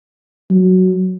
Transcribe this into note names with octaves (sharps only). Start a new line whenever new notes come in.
F#3